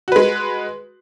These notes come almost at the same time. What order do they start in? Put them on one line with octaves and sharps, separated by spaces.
F#4 B4 G#3